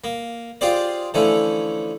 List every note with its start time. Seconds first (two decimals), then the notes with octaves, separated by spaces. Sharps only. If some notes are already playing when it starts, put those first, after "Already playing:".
0.04 A#3
0.61 F4 G4 G#4 C5 D5
1.14 D3 E3 F3 A3 C#4